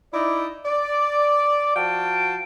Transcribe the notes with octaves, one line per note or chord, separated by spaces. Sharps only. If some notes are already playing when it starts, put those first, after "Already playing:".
D#4 E4 D5
D5
F3 F#4 F5 G5 A5